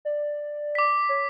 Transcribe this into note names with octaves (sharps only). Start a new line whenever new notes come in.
D5
D6 B6
C#5